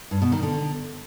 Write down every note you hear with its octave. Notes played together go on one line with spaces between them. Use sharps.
G2
B2
D#3
D3